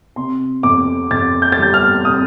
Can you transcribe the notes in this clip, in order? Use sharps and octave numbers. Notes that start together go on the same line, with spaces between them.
C3 C6
F2 D6
F2 A6
G6
A6
G3 G6
F6
C3 D#6